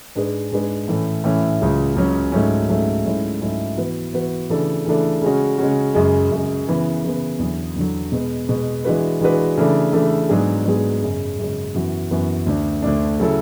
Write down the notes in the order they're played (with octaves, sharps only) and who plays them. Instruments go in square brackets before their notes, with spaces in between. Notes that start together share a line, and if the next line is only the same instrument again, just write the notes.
[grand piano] G#2 G#3 D4 G#4 B4
G#2 G#3 D4 G#4 B4
A2 E3 A3 C#4
A2 E3 A3 C#4
C#2 C#3 F#3 C#4
C#2 C#3 F#3 C#4
G#2 F#3 A3 C#4
G#2 F#3 A3 C#4
G#2 F#3 A3 C#4 E4
G#2 F#3 A3 C#4 E4
E3 B3 F#4 B4
E3 B3 F#4 B4
C#3 E3 A3 D4 A4
C#3 E3 A3 D4 A4
C#3 G#3 C#4 F#4
C#3 G#3 C#4 F#4
F#2 C#3 G#3
F#2 C#3 G#3
C#3 E3 B3
C#3 E3 B3
E2 D3 F#3
E2 D3 F#3
B2 G#3 B3
B2 G#3 B3
E3 G#3 D4 F#4 B4
E3 G#3 D4 F#4 B4
C#3 E3 A3 D4 A4
C#3 E3 A3 D4 A4
G#2 F#3 B3 D4 G#4
G#2 F#3 B3 D4 G#4
F#2 C#3 G#3 C#4
F#2 C#3 G#3 C#4
F#2 E3 B3 F#4
F#2 E3 B3 F#4
D2 D3 A3 D4
D2 D3 A3 D4
C#3 F#3 C#4 E4 A4